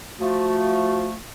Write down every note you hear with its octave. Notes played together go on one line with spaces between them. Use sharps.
F3 A3 F#4